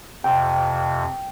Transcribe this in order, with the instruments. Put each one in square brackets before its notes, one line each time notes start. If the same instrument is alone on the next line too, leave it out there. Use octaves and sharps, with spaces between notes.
[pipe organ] F2 C3 [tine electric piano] G5